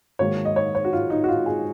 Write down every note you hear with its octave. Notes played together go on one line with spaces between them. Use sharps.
G#2 D#3 F#3 A#3 C#5
D#5
C#5
C#5
F#4
F4
D#4
F#4
F4
G#4